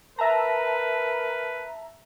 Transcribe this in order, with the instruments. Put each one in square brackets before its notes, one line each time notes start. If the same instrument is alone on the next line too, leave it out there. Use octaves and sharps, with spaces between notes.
[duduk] A#4 [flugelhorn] B4 [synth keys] E5 A5 A#5